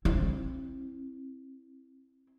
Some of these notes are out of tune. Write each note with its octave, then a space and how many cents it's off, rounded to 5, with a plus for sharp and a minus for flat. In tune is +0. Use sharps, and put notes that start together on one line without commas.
C4 +25 E4 +0